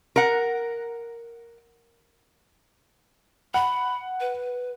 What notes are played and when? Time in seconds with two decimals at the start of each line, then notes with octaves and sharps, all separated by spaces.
0.16 A#4 F#5
3.54 F#5 B5
4.20 B4